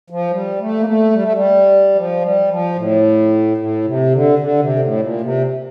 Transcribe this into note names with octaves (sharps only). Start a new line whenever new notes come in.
F3
G3
A3
A#3
A3
G3
A3
G3
F3
G3
F3
A2
A2
C3
D3
D3
C3
A2
A#2
C3